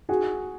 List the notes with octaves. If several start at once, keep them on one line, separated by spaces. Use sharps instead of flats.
F#4 G#4